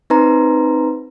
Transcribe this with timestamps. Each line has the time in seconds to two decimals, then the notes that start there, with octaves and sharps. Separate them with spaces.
0.10 C4 D#4 B4 A#5 C6